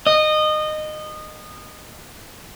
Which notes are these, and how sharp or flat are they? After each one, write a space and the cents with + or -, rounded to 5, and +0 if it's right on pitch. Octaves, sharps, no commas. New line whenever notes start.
D#5 -20